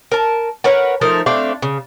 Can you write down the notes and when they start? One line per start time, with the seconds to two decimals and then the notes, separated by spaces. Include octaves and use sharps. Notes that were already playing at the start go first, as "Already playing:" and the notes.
0.12 A#4 A5
0.64 A#4 B4 C#5 F#5
1.01 F3 A3 D#4 A#4
1.26 A3 C4 D4 F5
1.62 C#3